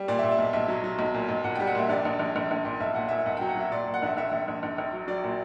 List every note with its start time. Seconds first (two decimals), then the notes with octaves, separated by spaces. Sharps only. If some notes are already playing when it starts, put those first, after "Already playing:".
Already playing: G3
0.08 A#2 D5
0.19 E5
0.23 A#2
0.31 E5
0.39 B1
0.53 B1 E5
0.68 F#3
0.84 F#3
0.99 B1
1.14 A#2
1.29 B1
1.44 A#2 F#5
1.55 G3 G5
1.67 F#5
1.75 A#2 E5
1.89 A#1 D5
2.05 A#1
2.19 A#1
2.36 A#1
2.51 A#1
2.65 A#2
2.80 B1 E5
2.95 A#2 F#5
3.09 A#2 E5
3.26 B1 F#5
3.37 F#3 G5
3.49 F#5
3.56 F#3 E5
3.72 A#2 D5
3.86 A#2
3.94 F#5
4.03 A#1 E5
4.17 A#1 E5
4.32 A#1
4.48 A#1
4.63 A#1
4.78 A#1
4.93 F#3
5.07 F#3 D5
5.24 A#2